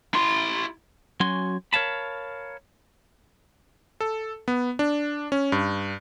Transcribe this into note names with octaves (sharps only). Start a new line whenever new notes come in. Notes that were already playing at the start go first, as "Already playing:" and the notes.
E4 C6
F#3 C#4 F#4 G#5 C6
A#4 C#5 F5 A5 B5
A4
B3
D4
C#4
G2